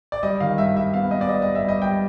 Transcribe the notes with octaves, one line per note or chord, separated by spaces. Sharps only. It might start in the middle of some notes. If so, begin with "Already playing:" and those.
D5
G3 D#5
D#3 F5
G2 E5
G2 E5
B3 F5
B3 D#5
D5
G3 D#5
G2 D#5
E5
G3 D#5
G3 G5